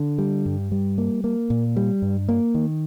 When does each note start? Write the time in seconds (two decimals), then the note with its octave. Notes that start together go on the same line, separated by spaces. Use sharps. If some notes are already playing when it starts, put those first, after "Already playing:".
Already playing: D3
0.18 G3
0.46 G2
0.72 G3
0.98 A#3
1.24 A#3
1.50 A#2
1.76 G3
2.02 G2
2.29 A#3
2.55 D#3